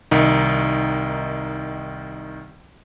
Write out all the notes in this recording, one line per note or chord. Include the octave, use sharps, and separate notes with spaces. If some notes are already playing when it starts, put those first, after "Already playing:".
C2 D#3 D#4